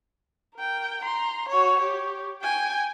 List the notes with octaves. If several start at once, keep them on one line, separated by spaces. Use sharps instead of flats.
A#4 G5
A#5 C6
F#4 C#5
G4 C#5
G5 G#5